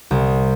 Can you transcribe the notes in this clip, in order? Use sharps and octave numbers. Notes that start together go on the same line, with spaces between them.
C2